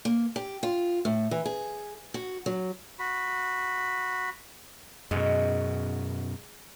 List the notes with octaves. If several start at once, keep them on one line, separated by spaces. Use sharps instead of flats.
A#3
G4
F4
A2
E3
G#4
F#4
F#3
F#4 B5
F#2 B2 G#3